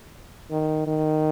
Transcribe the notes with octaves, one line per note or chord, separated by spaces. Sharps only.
D#3
D#3